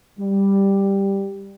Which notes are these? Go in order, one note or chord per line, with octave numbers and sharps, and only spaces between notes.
G3